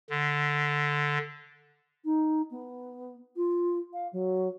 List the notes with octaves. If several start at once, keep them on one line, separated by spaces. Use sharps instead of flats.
D3
D#4
B3
F4
F5
F#3